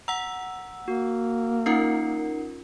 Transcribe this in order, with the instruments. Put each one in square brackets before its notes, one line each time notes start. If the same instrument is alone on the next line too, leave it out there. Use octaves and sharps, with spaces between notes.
[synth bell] F#5 E6 [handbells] A#5
[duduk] A#3 [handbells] F#4
[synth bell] C#4 F4 A#4 [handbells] D#4 F#5 C7